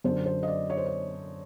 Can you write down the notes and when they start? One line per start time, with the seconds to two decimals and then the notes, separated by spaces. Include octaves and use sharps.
0.04 F#2 D3 C5
0.26 C5
0.43 D#5
0.48 D5
0.70 C#5
0.77 C5
0.86 C#5